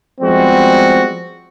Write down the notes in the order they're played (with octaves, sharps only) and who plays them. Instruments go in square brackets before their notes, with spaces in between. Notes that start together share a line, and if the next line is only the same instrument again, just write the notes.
[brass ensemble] F3 G3 G#3 B3 C4 F#4